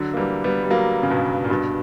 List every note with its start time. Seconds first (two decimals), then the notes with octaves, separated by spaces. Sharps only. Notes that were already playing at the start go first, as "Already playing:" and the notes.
Already playing: D3 F#3
0.14 A#3
0.17 E3 G3
0.44 G3 B3
0.64 G3
0.70 F#3 A#3
1.03 C#3
1.10 G2 B2
1.44 A#2
1.50 G2 B2